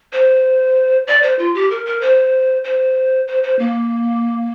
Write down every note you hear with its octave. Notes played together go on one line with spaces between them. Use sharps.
C5
D5
C5
F4
G4
A#4
A#4
C5
C5
C5
C5
A#3